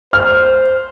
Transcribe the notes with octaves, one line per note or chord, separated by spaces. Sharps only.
C5 F6